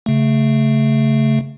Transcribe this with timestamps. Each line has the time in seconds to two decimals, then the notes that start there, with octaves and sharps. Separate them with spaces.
0.06 C#3 A3